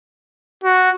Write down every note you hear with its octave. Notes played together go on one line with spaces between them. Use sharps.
F#4